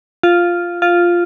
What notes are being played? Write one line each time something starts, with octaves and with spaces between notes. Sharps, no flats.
F4
F4